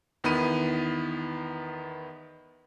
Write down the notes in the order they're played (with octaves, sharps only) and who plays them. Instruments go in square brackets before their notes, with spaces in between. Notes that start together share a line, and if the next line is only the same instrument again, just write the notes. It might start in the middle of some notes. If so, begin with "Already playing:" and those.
[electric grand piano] E2 D#3 B3 E4 B5 D#7